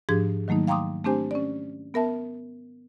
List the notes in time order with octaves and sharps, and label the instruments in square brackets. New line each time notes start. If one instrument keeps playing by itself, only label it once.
[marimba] G#2 F3 D4 G4 G#4 G#6
D#3 F#3 A3 A#3 D#4
F5 G5 A#5 C6 D6 D#6
A3 C4 D4 G4 C5 G#5
C#4 D5
B3 A#4 E5 A5